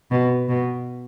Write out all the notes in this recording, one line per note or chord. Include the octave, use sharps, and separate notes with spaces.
B2
B2